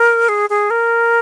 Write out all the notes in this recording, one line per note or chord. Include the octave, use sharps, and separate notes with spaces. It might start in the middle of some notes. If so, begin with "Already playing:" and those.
Already playing: A#4
G#4
G#4
A#4